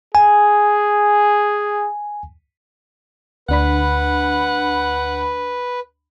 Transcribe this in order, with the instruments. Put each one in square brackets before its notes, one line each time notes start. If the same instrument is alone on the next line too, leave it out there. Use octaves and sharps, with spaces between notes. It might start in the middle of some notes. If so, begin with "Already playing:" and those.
[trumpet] G#4 [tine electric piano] G#5
[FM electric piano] D2 D4 B5 [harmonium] B4 [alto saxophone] F#5